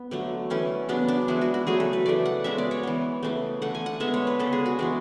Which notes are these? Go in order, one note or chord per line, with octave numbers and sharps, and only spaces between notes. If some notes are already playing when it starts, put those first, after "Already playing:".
Already playing: B3
D3 F#3 A3
E3 A3 C#4
C#3 F#3 B3 D4
D4
E3 G#3 B3 E4
F#4
F#4
C#3 F#3 A3 G#4
A4
B4
C#3 E3 A3 D5
F#5
C#3 G#3 B3 E5
D5
C#5
E3 B3
C#3 E3 A3
D3 A3 F#5
G#5
F#5
D3 G#3 B3 E5
C#5
B4
C#3 G#3 B3 A4
G#4
F#4
E3 G#3 B3 D4